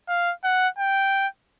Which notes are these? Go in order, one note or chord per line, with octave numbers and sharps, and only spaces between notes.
F5
F#5
G5